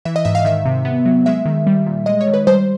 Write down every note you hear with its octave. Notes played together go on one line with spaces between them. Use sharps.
E3 E5
D#5
G#2 E5
F5
D#3 E5
C3
B3
F#3
G#3 E5
D#3
G3
A#2
G#3 D#5
C#5
D#3
B4
G3 C5